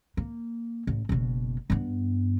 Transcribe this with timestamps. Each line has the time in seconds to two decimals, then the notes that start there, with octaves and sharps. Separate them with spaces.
0.17 A#3
0.87 A1
1.09 F#1 B2
1.70 G2 B3